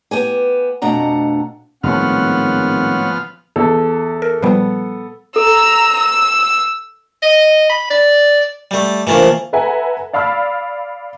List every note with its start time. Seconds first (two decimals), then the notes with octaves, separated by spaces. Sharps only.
0.11 B3 G4 G#5
0.82 F2 B2 A3 D4 F#5 A#5
1.83 G#1 A2 F3 G3 B3 C#4 F#5 F6
3.56 E2 A4
4.22 A#4
4.43 A#2 F3 G3 B3
5.36 A4 A#5 E6
5.96 E6
7.23 D#5
7.70 B5
7.90 D5
8.71 G3 A3
9.07 C3 E3 F3 A3 A#3 D4
9.53 A4 B4 E5 F#5 G#5 A#5
10.13 D5 F5 B5 E6 F6